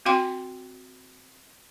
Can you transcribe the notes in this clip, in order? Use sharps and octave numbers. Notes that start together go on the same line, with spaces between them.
C4 F#4 F5 G5 C6